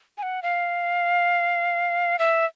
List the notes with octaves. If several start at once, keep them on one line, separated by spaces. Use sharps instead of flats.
G#5
F#5
F5
E5